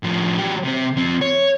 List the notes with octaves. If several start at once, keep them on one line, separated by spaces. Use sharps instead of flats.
A2 F3
F#3 G4
C3 C4
F2 C4
C#5